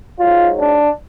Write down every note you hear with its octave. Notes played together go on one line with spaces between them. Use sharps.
G#2 F#3 F4
D4